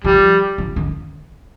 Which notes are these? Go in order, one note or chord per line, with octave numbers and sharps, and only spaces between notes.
F3 G3
F3
D#3